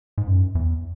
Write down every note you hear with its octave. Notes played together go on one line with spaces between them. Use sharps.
G#2
F#2
E2